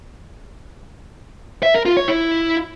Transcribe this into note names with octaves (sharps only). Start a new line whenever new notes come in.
E5
A#4
F4
C#5
E4